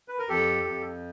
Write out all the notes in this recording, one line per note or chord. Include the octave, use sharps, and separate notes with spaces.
B4
A#4
F2 G4 A4
F2